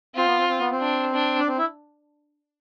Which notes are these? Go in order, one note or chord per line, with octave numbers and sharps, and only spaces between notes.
C4 F4
B3
C4
C4
B3
C4
D4
D4
D4
C4
E4